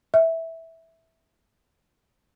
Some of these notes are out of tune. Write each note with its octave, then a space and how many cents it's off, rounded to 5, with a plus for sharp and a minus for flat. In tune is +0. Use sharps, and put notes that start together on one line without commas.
E5 -10